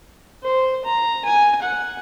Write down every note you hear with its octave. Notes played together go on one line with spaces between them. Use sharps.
C5
A#5
G#5
F#5